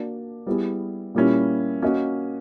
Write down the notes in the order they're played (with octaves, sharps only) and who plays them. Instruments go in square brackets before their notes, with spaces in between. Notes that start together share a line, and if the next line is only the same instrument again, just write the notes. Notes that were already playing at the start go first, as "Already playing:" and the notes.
Already playing: [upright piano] A#3 D4 F#4 D5
G3 B3 E4 G#4
A#2 G3 A#3 C#4 E4
A#3 C#4 F#4 A#4 D#5